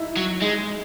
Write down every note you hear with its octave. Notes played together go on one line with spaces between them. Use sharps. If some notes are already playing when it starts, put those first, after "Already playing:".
Already playing: D#4 E4
F#3
G#3 D#4